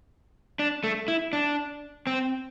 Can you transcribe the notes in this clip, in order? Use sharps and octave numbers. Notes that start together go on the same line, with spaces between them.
D4
A3
E4
D4
C4